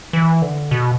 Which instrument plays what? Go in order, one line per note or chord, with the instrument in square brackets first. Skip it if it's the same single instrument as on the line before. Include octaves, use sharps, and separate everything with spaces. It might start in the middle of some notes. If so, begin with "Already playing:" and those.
[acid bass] E3
D3
B2